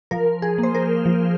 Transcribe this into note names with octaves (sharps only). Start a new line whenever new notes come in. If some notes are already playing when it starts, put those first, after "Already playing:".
F3 A#4
G#4
A#3
C5
A#4
F3